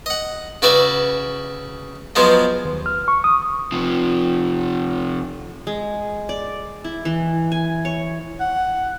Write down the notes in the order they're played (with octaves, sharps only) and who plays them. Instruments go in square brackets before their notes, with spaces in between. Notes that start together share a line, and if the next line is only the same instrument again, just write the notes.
[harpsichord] D#5 F#5
C#3 F#4 B4 D5 E5
F3 F#3 G#3 B3 C5
[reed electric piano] D#2
F6
C#6
D#6
[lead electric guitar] C3 F3
[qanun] G#3
D5
E4
E3
G#5
C#5
[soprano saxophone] F#5